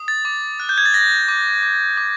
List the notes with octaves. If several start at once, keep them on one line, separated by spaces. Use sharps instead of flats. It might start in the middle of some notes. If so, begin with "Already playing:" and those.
Already playing: D#6
A6
D6
F#6
G6
G#6
A6
F#6 A#6
D6
D6
D6